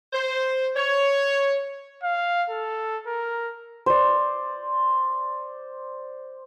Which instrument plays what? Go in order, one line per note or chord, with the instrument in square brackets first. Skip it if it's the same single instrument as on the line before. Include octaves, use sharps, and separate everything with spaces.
[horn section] C5
C#5
[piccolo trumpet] F5
A4
A#4
[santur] C5 D5